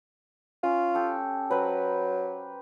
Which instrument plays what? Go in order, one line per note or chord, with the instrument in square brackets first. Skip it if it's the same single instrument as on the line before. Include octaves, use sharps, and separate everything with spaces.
[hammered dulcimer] C#4 [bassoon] F4
[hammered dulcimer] G4 A4
[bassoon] F#3 [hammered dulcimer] B4 C5 A#5